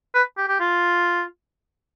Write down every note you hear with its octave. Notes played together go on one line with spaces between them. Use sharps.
B4
G4
G4
F4